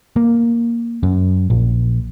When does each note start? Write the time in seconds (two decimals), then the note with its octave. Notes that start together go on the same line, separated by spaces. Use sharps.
0.16 A#3
1.03 F#2
1.50 A#1